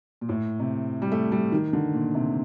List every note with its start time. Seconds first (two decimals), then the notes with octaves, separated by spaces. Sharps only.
0.21 A#2
0.29 A2
0.60 C3
1.02 G3
1.12 A3
1.32 G3
1.52 D#3
1.73 D3
1.94 A#2
2.15 C3